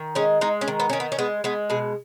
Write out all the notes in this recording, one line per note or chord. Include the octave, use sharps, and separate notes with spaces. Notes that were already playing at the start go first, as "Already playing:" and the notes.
Already playing: D#3
G#3 C#4
G#3 D#4
C#4
D#3
B3
D#3 C#4
B3
C#4
G#3 B3
G#3 B3
B2 G#4